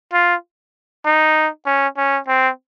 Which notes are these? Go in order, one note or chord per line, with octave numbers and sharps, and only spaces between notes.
F4
D#4
C#4
C#4
C4